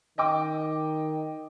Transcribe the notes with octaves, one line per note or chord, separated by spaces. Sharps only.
D#3 D#5 G5 D6